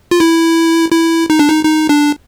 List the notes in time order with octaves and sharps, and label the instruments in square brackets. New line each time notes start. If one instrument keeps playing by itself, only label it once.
[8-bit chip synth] F4
E4
E4
D#4
D4
D#4
D#4
D4